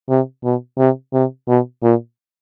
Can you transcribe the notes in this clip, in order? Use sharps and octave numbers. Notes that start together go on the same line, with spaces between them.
C3
B2
C3
C3
B2
A#2